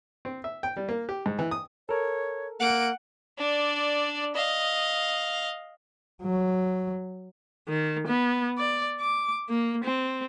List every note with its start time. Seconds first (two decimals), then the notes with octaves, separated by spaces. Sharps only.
0.25 C4
0.44 E5
0.63 G5
0.77 G3
0.89 A#3
1.09 G4
1.26 G#2
1.39 E3
1.51 D#6
1.89 A4 A#4 C#5
2.60 A#3 F#5 D7
3.38 D4 D5
4.34 D#5 F5
6.23 F#3
7.68 D#3
8.07 B3
8.58 D5
9.00 D6
9.49 A#3
9.84 C4